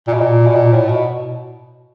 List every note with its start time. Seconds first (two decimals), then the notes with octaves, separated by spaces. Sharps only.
0.07 A#2
0.13 B2
0.21 A#2
0.46 B2
0.55 A#2
0.73 A2
0.89 B2